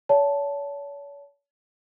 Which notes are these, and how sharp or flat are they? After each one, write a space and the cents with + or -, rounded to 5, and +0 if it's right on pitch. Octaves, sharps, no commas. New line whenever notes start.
C#5 +40 F5 -10 A5 -5